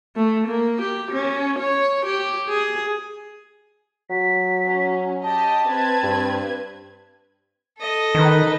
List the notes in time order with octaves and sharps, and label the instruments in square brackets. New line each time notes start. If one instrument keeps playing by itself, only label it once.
[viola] A3
A#3
G4
C#4
C#5
G4
G#4
[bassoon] F#3 [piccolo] B6
[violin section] C#4
[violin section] G4 D#5 [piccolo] A5
[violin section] C4 B4 G#6
[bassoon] G2
[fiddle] A4 D#5
[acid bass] D#3 [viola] D#4 B4